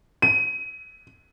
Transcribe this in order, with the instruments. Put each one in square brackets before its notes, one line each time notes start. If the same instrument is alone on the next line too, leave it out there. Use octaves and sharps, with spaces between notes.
[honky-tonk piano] D#7